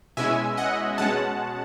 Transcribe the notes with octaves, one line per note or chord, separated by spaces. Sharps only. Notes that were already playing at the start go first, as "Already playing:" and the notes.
B2 G#3 C#4 E4 E5 G#5
D#5 F#5
B2 G#3 C#4 F#5 A5